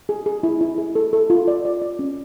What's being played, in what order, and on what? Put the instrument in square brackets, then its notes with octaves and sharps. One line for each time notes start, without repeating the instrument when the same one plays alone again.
[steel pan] G#4
G#4
E4
E4
G#4
A4
A4
F4
D5
D5
D5
C#4